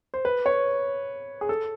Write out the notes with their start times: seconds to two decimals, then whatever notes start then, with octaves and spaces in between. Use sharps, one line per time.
0.14 C5
0.25 B4
0.46 C#5
1.41 G#4
1.49 A4